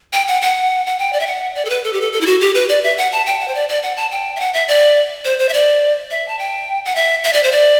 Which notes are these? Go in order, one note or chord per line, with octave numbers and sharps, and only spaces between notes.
G5
F#5
F#5
F#5
G5
D5
E5
F#5
D5
A4
B4
A4
G4
A4
A4
E4
F#4
G4
B4
D5
E5
F#5
A5
G5
F#5
C5
D5
D5
F#5
A5
G5
E5
F#5
E5
D5
C5
C5
E5
D5
E5
A5
G5
F#5
E5
E5
D5
C5
D5